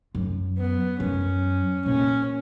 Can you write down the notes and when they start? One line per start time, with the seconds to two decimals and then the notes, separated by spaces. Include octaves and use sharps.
0.15 F#2
0.58 B3
1.00 F#2 C#4
1.85 A#2 C#4